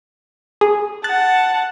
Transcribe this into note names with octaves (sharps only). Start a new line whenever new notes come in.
G#4
F#5 A5 F#6 A6